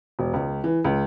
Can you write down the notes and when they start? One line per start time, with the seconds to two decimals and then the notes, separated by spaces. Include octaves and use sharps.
0.19 E1
0.33 C#2
0.64 E3
0.85 C#2